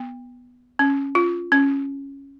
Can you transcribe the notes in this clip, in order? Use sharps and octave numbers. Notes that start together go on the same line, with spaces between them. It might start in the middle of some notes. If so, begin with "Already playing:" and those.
Already playing: B3
C#4
F4
C#4